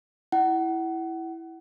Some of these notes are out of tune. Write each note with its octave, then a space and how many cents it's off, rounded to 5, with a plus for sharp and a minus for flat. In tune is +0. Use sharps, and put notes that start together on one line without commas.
E4 +0 F#5 +30